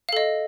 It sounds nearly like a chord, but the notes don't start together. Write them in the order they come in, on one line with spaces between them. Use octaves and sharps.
F5 A4 D#5